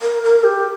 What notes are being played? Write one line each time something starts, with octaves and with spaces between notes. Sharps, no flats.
A#4
A#4
G4